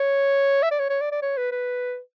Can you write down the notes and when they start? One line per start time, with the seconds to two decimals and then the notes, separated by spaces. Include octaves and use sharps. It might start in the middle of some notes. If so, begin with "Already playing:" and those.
Already playing: C#5
0.63 E5
0.71 D5
0.79 C#5
0.90 C#5
1.01 D5
1.12 D5
1.22 C#5
1.37 B4
1.52 B4